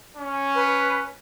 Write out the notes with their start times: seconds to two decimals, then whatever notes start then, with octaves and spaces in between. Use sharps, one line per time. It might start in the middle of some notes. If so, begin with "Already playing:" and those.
0.17 C#4
0.55 B4